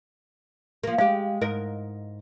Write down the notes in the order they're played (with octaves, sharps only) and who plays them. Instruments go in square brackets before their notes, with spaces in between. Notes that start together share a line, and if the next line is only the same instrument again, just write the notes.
[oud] F3 A#3
[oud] G#3 G4 [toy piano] F5
[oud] G#2 A#4 D#5